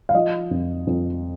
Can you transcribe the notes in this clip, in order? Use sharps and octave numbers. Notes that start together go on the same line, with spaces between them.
F5
F3 D#5
F2
F2